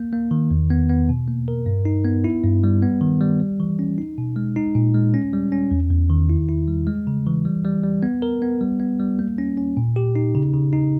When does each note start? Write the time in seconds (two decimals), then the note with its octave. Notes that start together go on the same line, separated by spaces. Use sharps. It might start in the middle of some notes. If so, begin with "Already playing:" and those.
Already playing: A#3
0.13 A#3
0.31 D#3
0.51 E2
0.70 B3
0.89 B3
1.09 B2
1.28 A#3
1.48 A#4
1.66 G2
1.85 D#4
2.05 B3
2.24 E4
2.43 G2
2.64 G3
2.82 B3
3.01 D#3
3.21 G3
3.40 G3
3.60 E3
3.79 C#4
3.98 D#4
4.18 B2
4.36 G#3
4.56 D#4
4.75 A#2
4.95 G#3
5.14 C#4
5.33 G3
5.52 C#4
5.71 E2
5.91 E2
6.10 D#3
6.29 E4
6.49 E4
6.68 G3
6.87 G#3
7.07 C#3
7.27 E3
7.45 G3
7.64 G3
7.84 G3
8.03 B3
8.22 A#4
8.42 B3
8.61 G3
8.80 B3
9.00 G3
9.19 A#3
9.38 C#4
9.58 C#4
9.77 A#2
9.96 G4
10.16 D#4
10.35 C#3
10.53 C#3
10.73 D#4